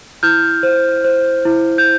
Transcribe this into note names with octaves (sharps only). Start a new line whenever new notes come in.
E4 F6 G6
C5
C5
E4
G6